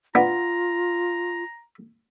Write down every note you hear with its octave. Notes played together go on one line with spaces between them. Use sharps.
B3 D4 F4 A#5